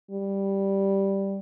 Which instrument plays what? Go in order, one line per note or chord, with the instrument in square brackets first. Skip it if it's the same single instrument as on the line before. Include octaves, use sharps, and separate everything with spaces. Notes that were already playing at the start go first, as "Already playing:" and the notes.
[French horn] G3